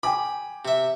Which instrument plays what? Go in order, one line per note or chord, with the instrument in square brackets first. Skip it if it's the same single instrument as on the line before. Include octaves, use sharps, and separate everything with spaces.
[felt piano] G5 G#5 D6 [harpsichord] B5
[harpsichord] C3 E5